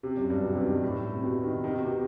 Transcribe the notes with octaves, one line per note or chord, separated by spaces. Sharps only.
C3
F#2
G2
B2
C3
D#3
G2
A2
C3
B2
D#3
D#3
C3
B2
C3